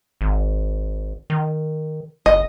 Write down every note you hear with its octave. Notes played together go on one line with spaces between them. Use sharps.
G#1
D#3
F#1 D#5